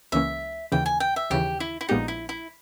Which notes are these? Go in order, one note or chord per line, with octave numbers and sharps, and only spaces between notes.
C#2 C#3 E3 A#3 C#4 E5
D#2 C#3 E3 G5
G#5
G5
E5
D#2 C#3 E3 G4
E4
E4
A#1 A#2 G#3 B3 D#4 G4
E4
E4